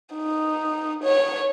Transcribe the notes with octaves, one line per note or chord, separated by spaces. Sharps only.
D#4
C#5